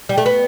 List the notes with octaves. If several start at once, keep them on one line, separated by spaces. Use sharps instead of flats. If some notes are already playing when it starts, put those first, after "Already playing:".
G3
A3
B3